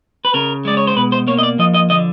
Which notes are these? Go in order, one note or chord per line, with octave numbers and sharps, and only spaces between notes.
B4
C#3 A#4
G#3 D5
C#5
C5
B2 B4
C5
A#3 C#5
D#5
D5
F3 D#5
D#5
D3 D#5